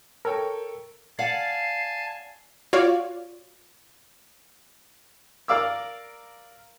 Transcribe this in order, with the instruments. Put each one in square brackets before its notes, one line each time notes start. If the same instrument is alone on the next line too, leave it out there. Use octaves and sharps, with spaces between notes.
[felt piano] A4 C#5 G5 [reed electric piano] A#4
[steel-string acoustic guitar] D5 F5 F#5 [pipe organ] G#5 A5 [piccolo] C7
[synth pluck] F4 F#4 C#5 D5 F5
[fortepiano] A#4 D5 F5 D6 E6